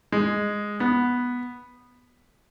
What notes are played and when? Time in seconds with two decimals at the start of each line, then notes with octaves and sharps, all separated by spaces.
0.12 G#3
0.80 B3